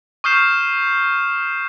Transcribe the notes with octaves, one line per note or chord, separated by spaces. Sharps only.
C#6 D#6 F6 G6 C7 E7